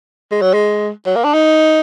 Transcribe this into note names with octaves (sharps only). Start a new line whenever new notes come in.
G#3
F#3
G#3
F#3
A#3
D4
D#4